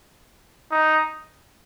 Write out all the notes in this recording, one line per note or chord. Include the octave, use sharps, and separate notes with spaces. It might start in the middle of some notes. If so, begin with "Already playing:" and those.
D#4